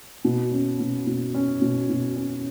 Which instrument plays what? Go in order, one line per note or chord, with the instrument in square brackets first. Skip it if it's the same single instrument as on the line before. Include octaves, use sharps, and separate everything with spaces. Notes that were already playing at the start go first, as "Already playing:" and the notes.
[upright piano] B2
C#4
B2
B2
C#4
B2
B2
C#4